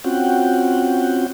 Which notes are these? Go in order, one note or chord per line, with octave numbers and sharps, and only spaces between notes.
C4 C#4 F4 F#4 F#5 G5